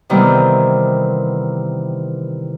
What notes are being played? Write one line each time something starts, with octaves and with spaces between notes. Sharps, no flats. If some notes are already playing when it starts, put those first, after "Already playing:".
C3 D#3 E3 G3 B3 C4